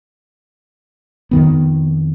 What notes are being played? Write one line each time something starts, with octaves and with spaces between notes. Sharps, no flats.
F2 D#3 B3